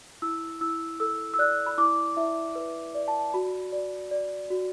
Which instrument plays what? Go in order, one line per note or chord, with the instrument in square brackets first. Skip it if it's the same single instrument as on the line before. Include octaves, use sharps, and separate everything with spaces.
[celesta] E4 E6
E4 E6
A4 E6
E6
D5 F#6
B5
E4 D6
E4 E5
B4
D5
A5
F#4 B5
D5
D5
F#4